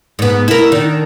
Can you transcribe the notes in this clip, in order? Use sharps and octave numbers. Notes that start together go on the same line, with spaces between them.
G#2 B3
E4 A#4
D#3 D4